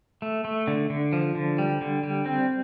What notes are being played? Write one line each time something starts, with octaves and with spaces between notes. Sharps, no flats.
A3
A3
D3
D3
F3
D3
G3
D3
G3
C4